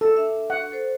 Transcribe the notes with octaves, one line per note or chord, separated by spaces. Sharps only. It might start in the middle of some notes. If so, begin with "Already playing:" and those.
A4 E6
D4 E5
F#5
A4 C5